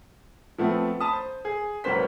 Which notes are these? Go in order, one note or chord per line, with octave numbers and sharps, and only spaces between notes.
F3 A3 B3 C4
A5 B5 D#6
C5
G#4
C#2 F#3 A#3 B4 C5 B6